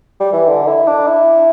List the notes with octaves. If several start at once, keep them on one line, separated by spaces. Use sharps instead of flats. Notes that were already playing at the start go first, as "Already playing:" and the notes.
G3
E3
D3
E4
D4
E4